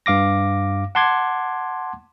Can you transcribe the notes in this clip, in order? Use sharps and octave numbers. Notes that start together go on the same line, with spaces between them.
G2 F5 D6 A#6
F#5 A5 C6 D6 G#6